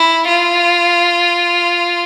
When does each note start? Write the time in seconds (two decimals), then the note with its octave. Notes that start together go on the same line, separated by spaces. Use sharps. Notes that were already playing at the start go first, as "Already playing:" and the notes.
Already playing: E4
0.28 F4